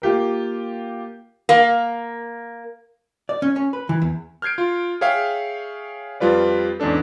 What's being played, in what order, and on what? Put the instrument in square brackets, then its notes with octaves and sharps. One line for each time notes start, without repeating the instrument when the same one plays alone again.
[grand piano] A#3 F4 G4 A#4
[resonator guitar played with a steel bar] A#3
[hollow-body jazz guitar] D5
C#4
C#4
B4
E3
E2
[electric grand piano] F6 G6 G#6 C7 D7
F4
G#4 C#5 E5 F5 G5
F2 G3 F4 B4 D5
E2 G#2 C#4 D4 A4